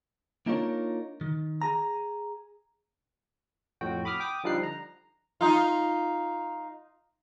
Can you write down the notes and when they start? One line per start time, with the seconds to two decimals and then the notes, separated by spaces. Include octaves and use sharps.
0.46 A#3 D4 D#4 F4 A#4 C#5
1.21 D#3
1.62 G#4 A#5
3.81 F2 A2 F#4 G5
4.05 B5 D6 D#6 F6
4.20 G5 D6 D#6
4.44 D3 F3 G3 D#4 F#6 C7
4.63 A#5
5.41 D#4 F4